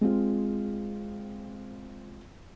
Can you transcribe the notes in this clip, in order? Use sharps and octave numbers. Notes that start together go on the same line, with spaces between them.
G#3 C4 F4